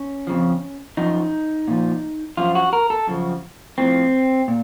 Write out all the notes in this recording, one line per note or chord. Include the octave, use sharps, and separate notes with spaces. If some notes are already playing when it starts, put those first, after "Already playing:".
Already playing: C#4
F2 C#3 F3
F#2 F3 D#4
A#2 F3
F#2 F3 F4
F#4
A#4
A4
F#2 C#3 F3
A2 F3 C4
A#2